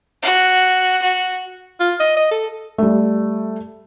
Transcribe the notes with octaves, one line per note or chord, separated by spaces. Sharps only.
F#4
F#4
F4
D#5
D#5
A4
G3 A3